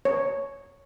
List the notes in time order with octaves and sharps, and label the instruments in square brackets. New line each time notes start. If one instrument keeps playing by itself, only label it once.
[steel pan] C#5